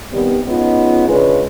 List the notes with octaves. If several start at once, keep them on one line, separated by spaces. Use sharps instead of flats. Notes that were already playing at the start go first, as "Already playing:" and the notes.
D#2 C3 D#3 G3 B3 G4
G#3 B3 C#4 D#4 F4
C#3 G#3 C#4 D4 F4 B4